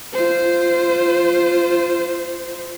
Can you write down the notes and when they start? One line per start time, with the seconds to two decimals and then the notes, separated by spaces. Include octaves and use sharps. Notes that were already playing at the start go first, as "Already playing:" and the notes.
0.13 F4 C5